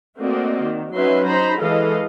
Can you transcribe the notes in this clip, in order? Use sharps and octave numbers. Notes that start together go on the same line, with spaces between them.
A3 A#3 C4 F#4 D5 D#5
D#3
F#3 C#4 D#4 B4 E5 C6
D#4 C5 A#5 B5
E3 G#3 A4 B4 D#5 F5